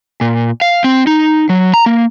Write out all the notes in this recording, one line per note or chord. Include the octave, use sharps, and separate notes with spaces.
A#2
F5
C4
D#4
F#3
A#5
A#3